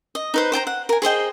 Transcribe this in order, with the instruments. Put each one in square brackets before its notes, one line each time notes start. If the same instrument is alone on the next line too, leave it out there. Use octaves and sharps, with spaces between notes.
[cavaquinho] D#5
D#4 B4 C5
C5 G5 A5 A#5
F#5
A#4 G#5
G#4 C5 D#5 G5